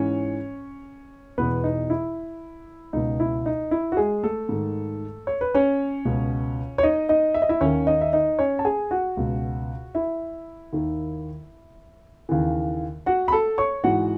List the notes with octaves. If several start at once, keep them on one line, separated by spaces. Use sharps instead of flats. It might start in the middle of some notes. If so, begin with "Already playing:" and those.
Already playing: G#2 E3 C#4 C#5
E2 B2 B3 B4
D#4
E4
C#2 B2 D#4
E4
D#4
E4
F#4
G#3 G#4
A3 A4
G#2 D#3
C#5
B4
C#4 C#5
C#2 B2
C#5
D#4 D#5
D#4 D#5
E5
D#5
E4 E5
D#2 D#3 C#4 C#5
D#4 D#5
E5
D#4 D#5
C#4 C#5
A5
G#4 G#5
F#4 F#5
C#2 B2
E4 E5
D#2 D#3
D#2 C#3 E3
F#4 F#5
B5
A4 A5
C#5 C#6
G#2 E3 F#4 F#5